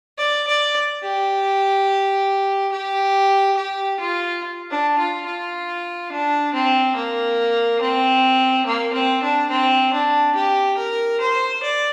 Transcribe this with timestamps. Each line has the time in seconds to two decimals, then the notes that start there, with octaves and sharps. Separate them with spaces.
0.18 D5
0.47 D5
1.03 G4
2.72 G4
3.57 G4
4.00 F4
4.71 D4
4.98 F4
5.26 F4
6.12 D4
6.53 C4
6.96 A#3
7.81 C4
8.66 A#3
8.94 C4
9.23 D4
9.51 C4
9.93 D4
10.35 G4
10.77 A#4
11.21 C5
11.63 D5